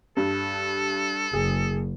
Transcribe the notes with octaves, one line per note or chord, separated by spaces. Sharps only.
G2 A4
F#1 G#4